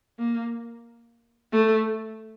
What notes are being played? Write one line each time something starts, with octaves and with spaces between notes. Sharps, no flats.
A#3
A3